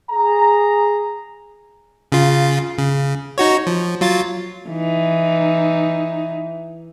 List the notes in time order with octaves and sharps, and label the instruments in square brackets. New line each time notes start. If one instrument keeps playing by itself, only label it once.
[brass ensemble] G#4 A#5
[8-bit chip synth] C#3 F4
C#3
D#4 F#4 C#5
F3
F#3 F4 A6
[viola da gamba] E3 D#4